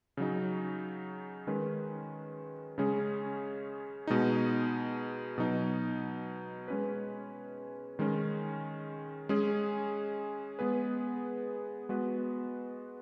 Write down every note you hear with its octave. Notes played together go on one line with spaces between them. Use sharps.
C#3 F#3 D#4
D#3 G#3 C#4 B4
C#3 G#3 C#4 G#4
B2 G#3 D#4
B2 F#3 D#4
G#3 C#4 B4
D#3 G#3 C#4
G#3 C#4 G#4
G#3 B3 G#4 B4
G#3 B3 F#4 B4